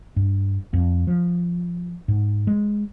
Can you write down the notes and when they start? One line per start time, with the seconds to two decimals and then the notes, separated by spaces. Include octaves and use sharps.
0.16 G2
0.73 F2
1.07 F3
2.08 G#2
2.47 G#3